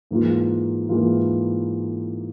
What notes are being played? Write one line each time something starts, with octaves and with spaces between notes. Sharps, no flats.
G#2 E3 A#3 F4
G#2 E3 A#3 F4